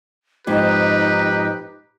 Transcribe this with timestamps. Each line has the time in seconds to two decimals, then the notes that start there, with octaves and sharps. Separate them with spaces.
0.47 F2 G#2 D#4 G4 B4